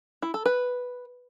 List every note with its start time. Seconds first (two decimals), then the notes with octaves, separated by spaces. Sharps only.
0.22 E4
0.34 A4
0.46 B4